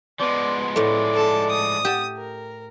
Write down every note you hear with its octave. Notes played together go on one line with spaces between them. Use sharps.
F3 G#3 B3 D5
A2 A3 D5
A4 A5
D#6
G4 A5
A#4